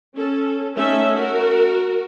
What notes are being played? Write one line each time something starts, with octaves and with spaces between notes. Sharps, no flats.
C#4 A4
A3 C#4 D#4 E5
F#4 A#4